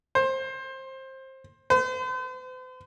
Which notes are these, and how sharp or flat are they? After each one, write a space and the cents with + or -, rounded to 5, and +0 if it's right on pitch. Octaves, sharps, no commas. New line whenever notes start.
C5 +20
C5 -45